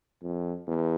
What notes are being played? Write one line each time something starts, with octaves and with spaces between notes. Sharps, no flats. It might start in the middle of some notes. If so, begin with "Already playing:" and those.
F2
E2